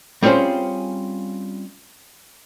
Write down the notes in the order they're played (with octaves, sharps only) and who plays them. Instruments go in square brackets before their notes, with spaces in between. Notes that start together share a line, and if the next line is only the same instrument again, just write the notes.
[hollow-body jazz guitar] G3 C4 C#4 F4 G#4 C5